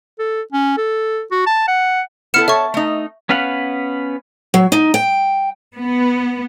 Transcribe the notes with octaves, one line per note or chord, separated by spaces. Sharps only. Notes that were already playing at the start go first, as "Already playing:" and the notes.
A4
C#4
A4
F#4
A5
F#5
B3 E4 A4 F6 C#7 E7
A4 C#5 E5 C#6
A3 D#4
B3 C#4 B4 F5 F#5
F#3
D#4
G5
B3